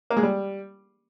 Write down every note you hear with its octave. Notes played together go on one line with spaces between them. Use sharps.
A#3
G#3
G3